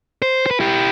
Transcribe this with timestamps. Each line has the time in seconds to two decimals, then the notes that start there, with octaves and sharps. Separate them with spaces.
0.22 C5
0.46 B4 C5
0.60 E4 G4